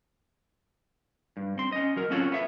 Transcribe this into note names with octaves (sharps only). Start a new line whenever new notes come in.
G2
C4 C6
C#4 D#5
F#3 A#4
C4 C#4 F4 F#4 A4 C#5
B3 E5